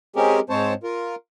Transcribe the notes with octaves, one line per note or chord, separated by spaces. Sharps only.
G#3 C4 C#4 G4 G#4 A#4
G#2 G#3 C4 C5 C#5 A5
F4 A#4